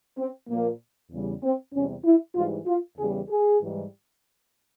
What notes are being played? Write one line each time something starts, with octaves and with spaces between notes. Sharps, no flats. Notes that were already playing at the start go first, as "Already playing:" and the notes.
C4
A#2 F3 A#3
E2 C#3 G3
C4
E2 C3 G3 C#4
E4
G#2 E3 G3 F4
F4
E2 C#3 E3 G3 G#4
G#4
G#2 E3 G3